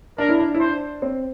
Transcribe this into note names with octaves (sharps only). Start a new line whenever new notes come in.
D4 A#4
E4
D4
E4
D4 C5
C4